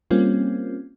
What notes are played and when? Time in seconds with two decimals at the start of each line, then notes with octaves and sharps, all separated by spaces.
0.10 G3 A#3 C4 C#4 F4